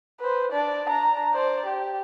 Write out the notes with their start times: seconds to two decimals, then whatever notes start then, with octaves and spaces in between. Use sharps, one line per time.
0.20 B4 C5
0.52 D4 D5
0.88 D4 A#5
1.34 C5 D5
1.66 G4